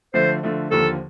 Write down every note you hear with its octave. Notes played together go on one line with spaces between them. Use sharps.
D3 F3 A3 C5
D3 F3 A3
D#2 D3 F3 A#3 A4